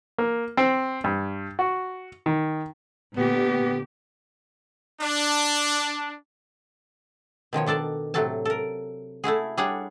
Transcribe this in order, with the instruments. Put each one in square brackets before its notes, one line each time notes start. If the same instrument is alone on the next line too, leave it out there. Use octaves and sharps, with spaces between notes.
[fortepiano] A#3
C4
G2
F#4
D#3
[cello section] A#2 D3 G4 [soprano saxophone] B3
[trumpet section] D4
[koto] B2 D#3 F3 C#5
D#3 D4 A4 D5 A5
A2 C3 F#3 F#4 A4 A5
A4 A#4
A3 E4 F#4 G#4
G3 D4 G#4 C#5 F#5